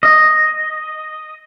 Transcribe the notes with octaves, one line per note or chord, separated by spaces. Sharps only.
D#5